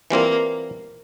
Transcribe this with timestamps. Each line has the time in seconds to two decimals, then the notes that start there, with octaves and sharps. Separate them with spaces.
0.10 E3 G3 A#3 C4 F4